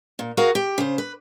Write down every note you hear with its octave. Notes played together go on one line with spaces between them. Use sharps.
A#2
F#4 G#4 A#4 F5
G4
C#3 C5
B4